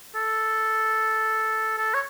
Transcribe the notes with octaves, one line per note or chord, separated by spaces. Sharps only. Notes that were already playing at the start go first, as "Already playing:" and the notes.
A4
A4
C#5